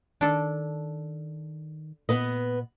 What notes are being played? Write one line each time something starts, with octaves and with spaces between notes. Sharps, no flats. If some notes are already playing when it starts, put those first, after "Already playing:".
D#3 D4 A4
A#2 B3 B4 D#5